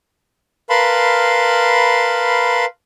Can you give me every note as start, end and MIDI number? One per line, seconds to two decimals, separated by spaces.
0.70 2.65 70
0.70 2.65 71
0.70 2.65 77
0.70 2.65 81
0.70 2.65 83
0.70 2.65 84